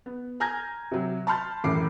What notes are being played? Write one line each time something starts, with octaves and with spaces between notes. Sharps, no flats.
B3
G#5 A#5 F6 G6 G#6 A#6
C3 F#3
A5 B5 C6 F6 G6 A6
E1 F#2 A2 D6 C7